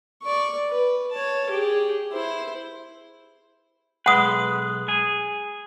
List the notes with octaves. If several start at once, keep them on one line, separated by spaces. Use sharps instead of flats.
D5 C#6
B4
C#5 A5
G4 G#4
E4 C5
B1 G#3 B4 F#5 D#6
G#4